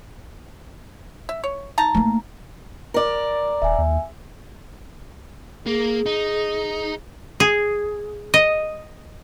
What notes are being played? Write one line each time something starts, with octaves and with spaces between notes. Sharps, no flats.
E5
C#5
D#4 A5 A#5
A3 A#3
A#4 D5
D#1 E5 G#5
D#2
A#3 G#4
D#4
G#4
D#5